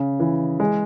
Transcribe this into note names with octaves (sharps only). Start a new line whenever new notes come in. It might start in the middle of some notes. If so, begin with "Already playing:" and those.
Already playing: C#3
E3
G#3